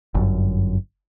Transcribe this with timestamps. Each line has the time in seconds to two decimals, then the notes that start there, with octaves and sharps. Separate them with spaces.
0.15 G1 F#2